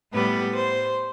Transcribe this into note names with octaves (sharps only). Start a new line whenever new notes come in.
A2 G3 B3 B4
C5